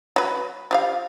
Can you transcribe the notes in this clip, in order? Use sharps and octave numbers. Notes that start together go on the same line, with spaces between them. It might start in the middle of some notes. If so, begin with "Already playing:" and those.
F#3 B4
F3 G4 F5